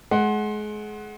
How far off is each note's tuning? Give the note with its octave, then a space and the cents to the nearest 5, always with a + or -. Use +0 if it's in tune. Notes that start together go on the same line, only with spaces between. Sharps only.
G#3 +30 F#5 +0